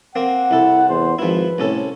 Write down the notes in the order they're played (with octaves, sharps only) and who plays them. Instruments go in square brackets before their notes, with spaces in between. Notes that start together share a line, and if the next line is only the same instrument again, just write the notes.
[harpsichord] A#3 C4 [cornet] F#5
[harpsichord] C2 A4 [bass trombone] E4
[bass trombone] E2 [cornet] C5
[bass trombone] G#1 [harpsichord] F3 E4 [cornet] B4
[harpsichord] C2 C#4 A4 [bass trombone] A2